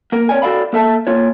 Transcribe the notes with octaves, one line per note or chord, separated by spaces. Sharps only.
A#3 A#4
C4 C#5 D5 G#5
F#4 A4 D5 F5 B5
A#3 A4 E5 A5
A#3 F4 C#5